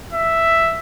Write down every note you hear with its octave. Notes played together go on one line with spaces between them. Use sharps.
E5